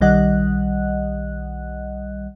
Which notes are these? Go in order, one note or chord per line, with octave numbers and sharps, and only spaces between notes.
B1 D#3 G3 D#5 F#5 F#6